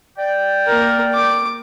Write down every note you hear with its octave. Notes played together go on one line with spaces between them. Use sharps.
D5 G5
A#3 A#4
D6